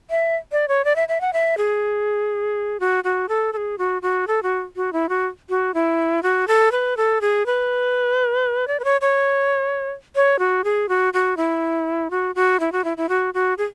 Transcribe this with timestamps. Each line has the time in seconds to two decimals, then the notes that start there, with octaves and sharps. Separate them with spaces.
0.10 E5
0.52 D5
0.68 C#5
0.85 D5
0.96 E5
1.08 E5
1.21 F#5
1.33 E5
1.58 G#4
2.80 F#4
3.04 F#4
3.29 A4
3.53 A4
3.57 G#4
3.78 F#4
4.02 F#4
4.27 A4
4.43 F#4
4.76 F#4
4.93 E4
5.09 F#4
5.49 F#4
5.74 E4
6.23 F#4
6.48 A4
6.72 B4
6.97 A4
7.21 G#4
7.46 B4
8.68 D5
8.80 B4
8.84 C#5
9.01 C#5
10.15 C#5
10.39 F#4
10.64 G#4
10.89 F#4
11.13 F#4
11.37 E4
12.11 F#4
12.35 F#4
12.60 E4
12.72 F#4
12.84 E4
12.97 E4
13.09 F#4
13.34 F#4
13.58 G#4